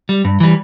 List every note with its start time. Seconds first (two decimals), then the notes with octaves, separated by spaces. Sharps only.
0.09 G3
0.25 G2
0.40 E3 G3